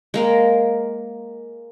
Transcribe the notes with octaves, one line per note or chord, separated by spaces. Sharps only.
G#3 A#3 A#4